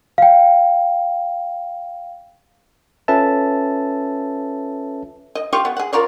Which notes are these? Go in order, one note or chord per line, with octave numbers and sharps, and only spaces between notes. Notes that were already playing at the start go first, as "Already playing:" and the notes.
F5 G5
C#4 F4 A4 B4 E5 A5
D#5
F4 G4 F5 C#6
B3
G#4 F#5
F4 A#4 C#5 D5